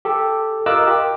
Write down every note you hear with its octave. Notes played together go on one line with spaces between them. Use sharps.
G4 A4
F4 A#4 D#5 D6 E6 F#6
G4